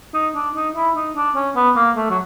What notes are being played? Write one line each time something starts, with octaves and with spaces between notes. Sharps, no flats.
D#4
D4
D#4
E4
D#4
D4
C#4
B3
A#3
A3
F#3